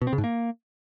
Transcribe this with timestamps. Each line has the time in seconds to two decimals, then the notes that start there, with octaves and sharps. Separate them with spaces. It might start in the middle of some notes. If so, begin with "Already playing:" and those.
0.02 B2
0.07 C4
0.13 C#3
0.18 G#2
0.24 A#3